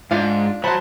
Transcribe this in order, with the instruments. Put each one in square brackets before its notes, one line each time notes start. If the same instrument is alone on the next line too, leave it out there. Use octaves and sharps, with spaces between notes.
[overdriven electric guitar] G#2 [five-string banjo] D4 F4 F5
[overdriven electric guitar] F#3 [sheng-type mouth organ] C5 A5 [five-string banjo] F#5 B5